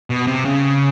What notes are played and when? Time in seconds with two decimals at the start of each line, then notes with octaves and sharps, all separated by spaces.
0.10 B2
0.27 C3
0.45 C#3